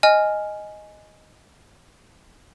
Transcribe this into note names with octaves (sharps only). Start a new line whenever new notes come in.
D#5 G#5 F6